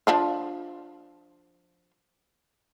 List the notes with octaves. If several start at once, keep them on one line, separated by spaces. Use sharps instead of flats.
F3 D4 F4